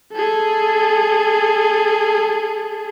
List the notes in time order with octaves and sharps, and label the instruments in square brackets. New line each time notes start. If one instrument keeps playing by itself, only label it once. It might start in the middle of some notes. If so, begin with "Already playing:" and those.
[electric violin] G#4 A4